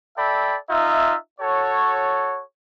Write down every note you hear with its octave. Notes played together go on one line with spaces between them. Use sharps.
A4 D5 E5 G5 B5
D#4 F4 E5
F#4 A4 C#5